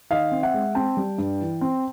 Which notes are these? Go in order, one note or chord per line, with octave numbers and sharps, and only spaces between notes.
D#3 D#5 F5
C4
E5 F#5
G#3
C4 G5 A5
G3
G2
E3
C4